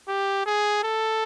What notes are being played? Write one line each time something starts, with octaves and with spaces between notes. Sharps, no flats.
G4
G#4
A4